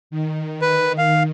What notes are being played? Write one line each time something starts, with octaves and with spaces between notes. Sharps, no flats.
D#3
B4
F5